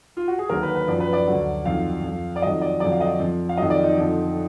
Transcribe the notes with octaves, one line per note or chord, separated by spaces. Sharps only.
F4
F#4
G#4
D#2 D3 F#3 A#4
B4
B4
F#2 F3 D5
B4
D5
D2 D3 F#3
F2 D#3 F#3 F5
F2 F3
D5
F2 D#3 F#3 D#5
D5
F2 D3 F#3 D5
F5
D#5
F2 F3
F5
F2 D#3 F#3 D#5
D5
D#4
F2 D3 F3